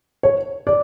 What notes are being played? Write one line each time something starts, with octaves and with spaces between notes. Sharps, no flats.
C#5
D5